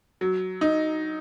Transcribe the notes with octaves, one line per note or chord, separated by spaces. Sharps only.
F#3
D#4